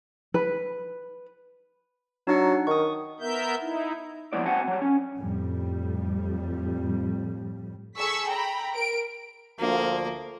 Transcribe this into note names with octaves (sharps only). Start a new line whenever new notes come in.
B4
F#3 D4 D#4 F#5
D#3 C#6 D#6
B3 A#4 E5 G6
D#4 E4
F3 G#3 A#3 B3 E4 D5
C4 F#4 C5 F#5 G#5 A5
F#3 G3
C#4
F2 A2 G3
G#4 A4 C#6 E6 B6
G5 A#5 B5
A#4 D7
D2 F3 A#3